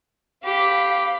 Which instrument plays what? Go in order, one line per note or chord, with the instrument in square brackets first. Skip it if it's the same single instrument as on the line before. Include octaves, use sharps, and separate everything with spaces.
[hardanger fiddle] G4 [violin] F5 B5